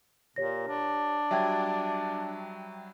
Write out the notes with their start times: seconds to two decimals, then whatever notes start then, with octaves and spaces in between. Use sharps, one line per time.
0.36 A#2 G4 C#5 A#6
0.67 D4
1.31 F#3 G3 E5 G5 G#6